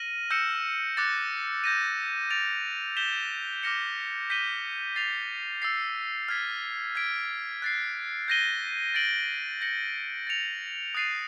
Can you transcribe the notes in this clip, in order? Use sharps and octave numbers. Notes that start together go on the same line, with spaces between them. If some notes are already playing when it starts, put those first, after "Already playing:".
Already playing: F6 A#6 D#7 F#7
E6 G6 A#6 C#7 E7
D6 F#6 A6 C#7
G6 A#6 D#7
A6 D7 F7
G6 B6 E7 G7
D6 F6 A#6 C#7 E7
G6 B6 D#7 G7
A6 C7 F7
E6 A6 C7
F6 G#6 B6
G#6 B6 D7
F#6 A6 C7
G6 A#6 D#7 G7
A6 D7 F#7
G6 A#6 C#7 F#7
A6 C#7 F7
D#6 F#6 A6 C7 D#7